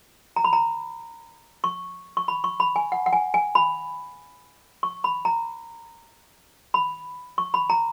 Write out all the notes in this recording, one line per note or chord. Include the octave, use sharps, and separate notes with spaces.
A#5
B5
A#5
C#6
C#6
B5
C#6
B5
G#5
F#5
F#5
G#5
G#5
B5
C#6
B5
A#5
B5
C#6
B5
A#5